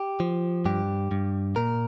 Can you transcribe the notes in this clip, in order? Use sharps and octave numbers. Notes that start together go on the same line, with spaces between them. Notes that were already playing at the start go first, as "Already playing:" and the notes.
Already playing: G4
F3
G2 G4
G2
A#2 A#4